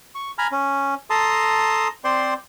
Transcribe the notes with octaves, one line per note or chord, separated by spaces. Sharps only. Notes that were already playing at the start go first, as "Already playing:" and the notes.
C#6
G#5 A#5 B5 F6
C#4
A4 A5 A#5 C6 D#6
C4 C5 D5 C6